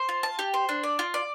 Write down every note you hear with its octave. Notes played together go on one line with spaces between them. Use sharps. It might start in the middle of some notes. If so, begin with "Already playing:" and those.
Already playing: C5
F4
A5
G4
C5
D4
D5
F4
D5